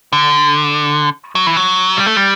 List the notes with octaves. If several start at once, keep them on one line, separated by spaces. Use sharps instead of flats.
D3
F#3
E3
F#3
G3
A3
G3